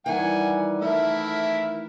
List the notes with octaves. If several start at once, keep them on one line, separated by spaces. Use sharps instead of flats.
D#3 E3 G3 F#5 G#5
A3 E4 A#4 E5